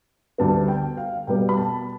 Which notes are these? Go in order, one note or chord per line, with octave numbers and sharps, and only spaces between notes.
D2 D3 G3 B3 A5
G5
F5
B2 G3 B3 G5
B5
A5